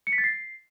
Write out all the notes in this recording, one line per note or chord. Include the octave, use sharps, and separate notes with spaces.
C#7
B6
A6
C7